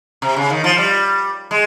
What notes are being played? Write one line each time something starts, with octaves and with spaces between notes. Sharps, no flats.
C3
C#3
D#3
F3
G3
G#3